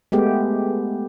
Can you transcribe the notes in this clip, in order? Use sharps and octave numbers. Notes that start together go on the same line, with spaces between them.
G#3 A3 B3 G4